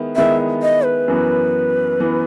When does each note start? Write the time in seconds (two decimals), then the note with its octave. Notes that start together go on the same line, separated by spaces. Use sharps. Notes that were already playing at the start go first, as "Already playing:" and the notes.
Already playing: D#3 G#3 B3 E4
0.16 D#3 G#3 B3 E4 E5
0.62 D#5
0.85 B4
1.08 F#2 E3 B3
2.00 E3 B3